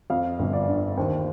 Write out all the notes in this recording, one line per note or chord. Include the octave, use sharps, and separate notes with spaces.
F2 F5
G1
D5
D3
D#2 C5